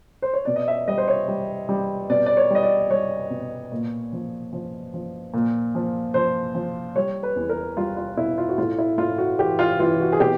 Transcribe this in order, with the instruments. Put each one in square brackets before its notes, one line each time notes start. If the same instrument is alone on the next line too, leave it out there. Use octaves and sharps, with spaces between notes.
[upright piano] C5
C#5
B2 D5
D#5
E5
G3 D#5
C5
C#5
G3
G3
B2 D5
D5
C#5
G3 D#5
D5
G3 C#5
B2
A#2
F3
F3
F3
A#2
F3
F3 C5
F3
G3 C#5
B4
E2
A#4
G3 F4
F4
B2 E4
F4
F#4
A2 F4
E4
A2 F4
F#4
E3 G4
F4
E3 F4
F#4
G#4
B2 G4